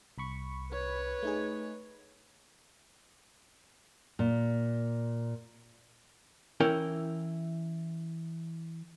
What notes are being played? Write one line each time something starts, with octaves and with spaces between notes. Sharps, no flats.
C2 B5 C#6
B4 C#5
A3 D#4 G#4
A#2
E3 C#4 E4 A#4 G5